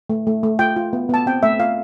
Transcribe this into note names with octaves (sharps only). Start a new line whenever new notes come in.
A3
A3
A3
F4 G5
F4
B3
B3 A5
C4 G5
A3 E5
F4 F5